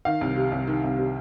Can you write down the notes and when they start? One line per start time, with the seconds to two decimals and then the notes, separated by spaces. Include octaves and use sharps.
0.05 D#3 F5
0.21 C2
0.36 C3
0.52 C2
0.67 D#3
0.84 C2
0.98 C3